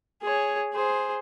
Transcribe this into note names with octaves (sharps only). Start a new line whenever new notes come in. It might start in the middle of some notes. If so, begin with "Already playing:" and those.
G#4 C#5
G#4 C5